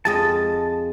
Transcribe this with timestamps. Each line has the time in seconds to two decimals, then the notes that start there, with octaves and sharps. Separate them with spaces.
0.05 F2 G#3 D#5 A5